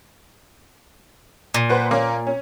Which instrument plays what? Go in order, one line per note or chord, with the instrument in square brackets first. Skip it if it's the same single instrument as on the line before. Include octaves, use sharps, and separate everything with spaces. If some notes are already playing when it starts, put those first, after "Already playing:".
[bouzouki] A#2
[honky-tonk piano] B4 C5 F#5
A#3 C#4
C#4